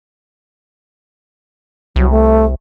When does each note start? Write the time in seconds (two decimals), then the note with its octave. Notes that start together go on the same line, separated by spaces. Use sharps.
1.96 C2 F#3
2.10 A3